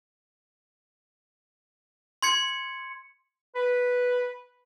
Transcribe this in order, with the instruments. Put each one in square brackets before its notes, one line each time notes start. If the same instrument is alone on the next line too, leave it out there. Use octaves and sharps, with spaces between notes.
[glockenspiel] C6 G#6 C#7
[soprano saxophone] B4